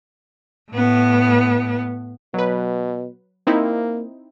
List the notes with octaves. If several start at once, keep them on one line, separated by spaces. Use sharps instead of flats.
A2 B3
B2 F#3 B4
A#3 C4 D#4 E4